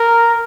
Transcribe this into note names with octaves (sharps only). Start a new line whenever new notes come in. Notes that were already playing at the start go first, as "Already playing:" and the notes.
Already playing: A#4